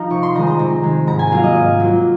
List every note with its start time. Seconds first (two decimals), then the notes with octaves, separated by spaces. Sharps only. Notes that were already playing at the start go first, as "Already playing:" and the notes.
Already playing: F3 D#4 A#5
0.10 C3 C#6
0.23 C6
0.35 D#3 G#3 A#5
0.47 A#5
0.59 C3
0.83 D#3 G#3
1.07 G#2 A#5
1.19 G#5
1.31 F#3 A#3 F4 F5
1.43 D#5
1.55 G#2
1.80 F#3 A#3 F4